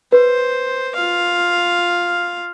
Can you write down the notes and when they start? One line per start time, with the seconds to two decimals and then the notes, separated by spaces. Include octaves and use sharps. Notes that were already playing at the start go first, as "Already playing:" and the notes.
0.12 B4 C5
0.95 F4 F5